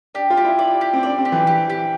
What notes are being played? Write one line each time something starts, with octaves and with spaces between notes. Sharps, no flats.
D4 G4
F4
G4
E4
D5
G4
C4
D4 D5
C4
G4
E3
G4
G4